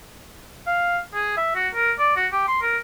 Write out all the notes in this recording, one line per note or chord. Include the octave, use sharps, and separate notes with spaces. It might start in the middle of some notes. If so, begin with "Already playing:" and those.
F5
G#4
E5
F#4
A#4
D5
F#4
G4
C6
A#4